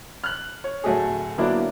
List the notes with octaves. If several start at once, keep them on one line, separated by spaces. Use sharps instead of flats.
F6 F#6
C#5
D1 A3 F#4 G#4
D3 F#3 A#3 B3 D4 E4